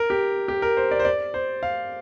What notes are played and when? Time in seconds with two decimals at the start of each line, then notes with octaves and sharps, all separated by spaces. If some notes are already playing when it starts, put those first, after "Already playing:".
Already playing: A#4
0.10 G4
0.48 G4
0.62 A#4
0.77 C5
0.91 D5
0.99 C5
1.05 D5
1.34 C5
1.63 F5